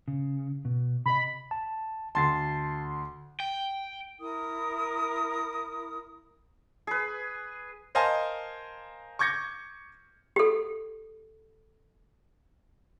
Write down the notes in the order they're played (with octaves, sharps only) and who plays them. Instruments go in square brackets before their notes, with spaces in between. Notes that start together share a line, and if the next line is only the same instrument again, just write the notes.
[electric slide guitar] C#3
B2
[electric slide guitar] C3 B4 D#5 [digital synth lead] B5
[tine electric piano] A5
[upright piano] D2 C6 [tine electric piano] A5 A6 C7
[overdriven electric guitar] G5
[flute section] E4 A#4 D#6
[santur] G#4 B4
[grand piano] A#4 C5 D#5 F5 G#5 A5
C#6 D6 G6 G#6 A#6 C#7
[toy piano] G4 A4